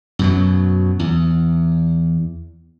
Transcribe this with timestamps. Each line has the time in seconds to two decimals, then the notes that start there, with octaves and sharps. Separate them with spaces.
0.19 F#2 B2 F#3
0.99 E2